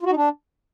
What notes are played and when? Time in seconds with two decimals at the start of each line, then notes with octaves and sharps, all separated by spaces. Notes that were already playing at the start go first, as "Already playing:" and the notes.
0.01 F4
0.06 F#4
0.11 D#4
0.16 D4